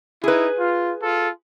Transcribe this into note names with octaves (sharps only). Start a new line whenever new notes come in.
D#4 E4 G#4 B4
F4
F4 A4